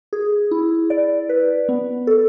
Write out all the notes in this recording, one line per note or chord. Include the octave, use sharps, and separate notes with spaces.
G#4
E4
D5
B4
B3
A4